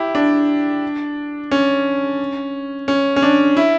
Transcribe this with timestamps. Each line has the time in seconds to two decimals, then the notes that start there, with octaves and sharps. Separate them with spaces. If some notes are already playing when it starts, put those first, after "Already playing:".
Already playing: E4 G4
0.15 D4
1.51 C#4
2.88 C#4
3.16 C#4
3.22 D4
3.57 E4